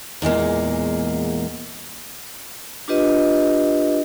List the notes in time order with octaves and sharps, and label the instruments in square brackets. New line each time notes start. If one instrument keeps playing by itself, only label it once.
[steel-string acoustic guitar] E2 A#2 G#3 A#3
[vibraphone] D4 F4 G4 B4 D#5